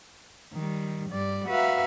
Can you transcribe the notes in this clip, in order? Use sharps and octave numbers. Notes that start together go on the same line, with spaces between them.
D#3 G3
G2 G3 D5
F#4 B4 E5 F5 A#5